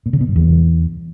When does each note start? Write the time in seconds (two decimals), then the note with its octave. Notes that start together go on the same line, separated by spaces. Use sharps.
0.06 A#2
0.13 C#3
0.21 B2
0.28 G2
0.36 E2